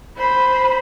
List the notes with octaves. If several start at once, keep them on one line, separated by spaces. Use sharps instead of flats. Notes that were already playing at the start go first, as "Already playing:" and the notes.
C5 B5